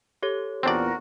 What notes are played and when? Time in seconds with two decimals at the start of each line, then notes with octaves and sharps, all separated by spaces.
0.23 G4 A4 C#5
0.63 E2 A#2 C4 D4 F#4 A#4 D5